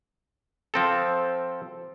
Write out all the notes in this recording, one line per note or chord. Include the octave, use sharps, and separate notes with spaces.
F3 C4 A4